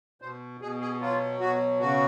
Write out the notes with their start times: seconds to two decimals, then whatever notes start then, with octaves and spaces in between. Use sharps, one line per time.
0.22 B2 C5
0.61 B2 G#4
0.81 G#4
1.01 F#3 F4
1.40 B2 F#4
1.80 C#3 F#4